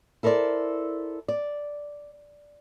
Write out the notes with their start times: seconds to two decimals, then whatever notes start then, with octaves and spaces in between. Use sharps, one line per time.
0.23 E4 A4 A#4 C5 D5
1.28 D5